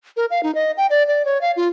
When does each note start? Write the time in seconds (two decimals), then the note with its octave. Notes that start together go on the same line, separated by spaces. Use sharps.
0.17 A#4
0.31 F5
0.43 D#4
0.55 D#5
0.77 G5
0.90 D5
1.08 D5
1.25 C#5
1.41 F5
1.56 F4